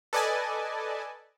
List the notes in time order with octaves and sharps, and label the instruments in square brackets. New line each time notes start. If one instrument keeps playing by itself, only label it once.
[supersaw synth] A4 B4 D5 D#5 G#5 A5